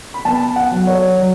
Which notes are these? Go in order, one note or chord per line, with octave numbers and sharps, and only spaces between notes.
B5
B3 A5
F#5
F#3
C#5
F#3